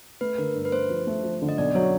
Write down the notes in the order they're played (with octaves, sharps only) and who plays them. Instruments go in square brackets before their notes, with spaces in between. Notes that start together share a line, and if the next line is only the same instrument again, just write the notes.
[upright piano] A3 [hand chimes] B4
[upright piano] D3 [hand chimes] A#4
[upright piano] G2
[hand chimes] B4
[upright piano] A3 [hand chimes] C5
[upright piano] F3
A3
F3
D3
[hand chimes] D#5
[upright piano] B1 [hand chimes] D5
[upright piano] F#3 [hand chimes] C#5